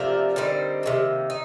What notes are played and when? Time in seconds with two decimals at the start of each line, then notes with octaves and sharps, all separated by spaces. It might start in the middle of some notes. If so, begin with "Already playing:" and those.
Already playing: C3 F3 A3 D4 A#4
0.36 D3 G3 C4 D#4
0.83 C3 D#3 A#3
1.30 D#4